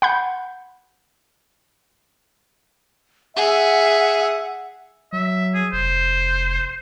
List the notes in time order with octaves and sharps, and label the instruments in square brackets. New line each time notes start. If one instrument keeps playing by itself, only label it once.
[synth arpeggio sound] F#5 B5 G6
[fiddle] G#4 [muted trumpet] E5 [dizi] F#5
[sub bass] F#3 [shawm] E5
[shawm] G#4
[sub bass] F1 [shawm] C5